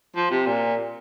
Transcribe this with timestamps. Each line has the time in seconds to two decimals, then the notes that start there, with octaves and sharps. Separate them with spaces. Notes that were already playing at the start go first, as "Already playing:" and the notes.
0.16 F3
0.31 C3
0.46 A#2